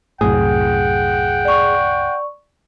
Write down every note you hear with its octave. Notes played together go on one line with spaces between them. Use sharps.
C2 F#2 A2 G#4 F#5 G5
D5 C#6